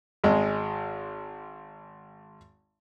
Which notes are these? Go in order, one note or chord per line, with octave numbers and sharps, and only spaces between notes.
G#1 G#3